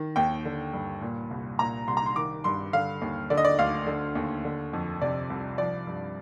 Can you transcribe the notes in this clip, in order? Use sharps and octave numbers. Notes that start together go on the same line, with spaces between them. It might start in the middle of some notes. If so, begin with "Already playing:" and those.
Already playing: D#3
D#2 G5
D3
G2
A#2
C2
A#2 A#5
C2 C6
A#5
C6
D#3 D6
G2 C6
D3 F5
D#2
D3 D5
D#5
D5
D2 F5
D3
D#2
D3
F2
C3 D5
C2
F3 D5
G2